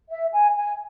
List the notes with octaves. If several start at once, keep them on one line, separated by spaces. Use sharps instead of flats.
E5
G#5
G#5